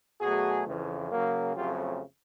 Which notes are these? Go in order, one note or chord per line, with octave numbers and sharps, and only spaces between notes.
B2 F#3 A3 F#4 G#4
F2 C#3 E3
C#3 F#3 A#3
F2 C#3 F#3 A3 C4 F4 G4